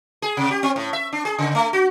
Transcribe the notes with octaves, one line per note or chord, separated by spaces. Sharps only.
G#4
C3
G4
C4
A2
E5
D4
G#4
C#3
A3
F#4